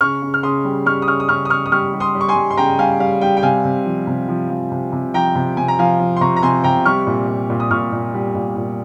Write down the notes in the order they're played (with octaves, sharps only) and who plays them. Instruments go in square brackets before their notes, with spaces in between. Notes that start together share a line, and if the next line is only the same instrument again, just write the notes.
[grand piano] C#3 C#6 F6
C#3
F6
C#3 C6 D#6
G3
G3 C#6 F6
D#6
C#3 C#6 F6
D#6
C#3 C#6 F6
D#6
C#3 C#6 F6
D#6
G3 C#6 F6
G3
C6 D#6
G3
C#6
G#5 C6
G3
C6
C#3 G5 A#5
G3 F5 G#5
G3 F5
G3 G5
G5
C3 F5 G#5
C3
F3
C3
F3
F3
C3
C3
F3 G5 A#5
C3
C3 G#5
A#5
F3 F5 G#5
F3
C6
C3 A#5 C#6
A#5
C3 G#5 C6
C3 G5 A#5
G3 C#6 F6
A#2
A#2
A#2
D#6
A#2 C#6 F6
A#2
G3
A#2
A#2